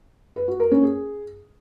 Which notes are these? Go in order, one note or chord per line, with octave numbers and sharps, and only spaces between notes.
B4
F#4
A#4
C#4
G#4